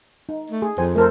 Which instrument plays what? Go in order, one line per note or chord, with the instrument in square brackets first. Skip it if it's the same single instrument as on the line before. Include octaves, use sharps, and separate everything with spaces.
[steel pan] D#4
[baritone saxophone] A3
[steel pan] G#4
[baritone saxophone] F2 [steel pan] C5 G#5
[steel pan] A3 A4 C5 [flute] A#4